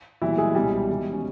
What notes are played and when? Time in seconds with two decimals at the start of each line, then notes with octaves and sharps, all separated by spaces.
0.22 B1 A#2 E3 G3 E4
0.38 G#3 G#4
0.55 C#2 B2 G3 G4
0.89 E1 E2 D#3
1.13 C#4